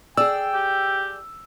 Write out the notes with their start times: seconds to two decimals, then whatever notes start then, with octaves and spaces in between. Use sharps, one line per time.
0.17 G#4 D5 G5 E6
0.54 G4